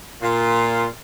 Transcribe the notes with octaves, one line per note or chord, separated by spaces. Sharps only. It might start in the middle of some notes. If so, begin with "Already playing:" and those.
A#2 F4